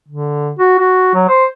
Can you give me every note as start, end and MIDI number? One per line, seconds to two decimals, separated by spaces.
0.08 0.51 50
0.59 0.78 66
0.80 1.12 66
1.14 1.24 54
1.28 1.45 72